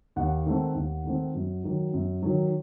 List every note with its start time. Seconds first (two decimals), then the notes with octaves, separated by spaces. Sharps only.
0.16 D#2 F#5
0.46 D#3 A3 C4
0.75 D#2
1.05 D#3 A3 C4
1.35 F#2
1.64 D#3 F#3
1.94 F#2
2.23 D#3 F#3